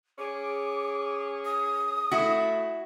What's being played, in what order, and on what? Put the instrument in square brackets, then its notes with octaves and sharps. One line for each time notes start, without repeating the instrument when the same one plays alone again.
[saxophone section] C#4 G#4 [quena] D6
[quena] D#6
[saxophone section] A3 [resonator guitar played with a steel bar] E4 F#4